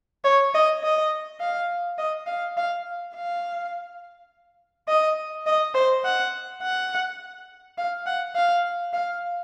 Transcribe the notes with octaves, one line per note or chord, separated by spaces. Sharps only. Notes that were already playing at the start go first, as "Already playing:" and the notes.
C#5
D#5
D#5
F5
D#5
F5
F5
F5
D#5
D#5
C5
F#5
F#5
F5
F#5
F5
F5